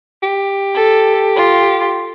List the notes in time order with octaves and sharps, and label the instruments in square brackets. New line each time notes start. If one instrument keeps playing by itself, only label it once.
[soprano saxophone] G4
[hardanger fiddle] A4
F4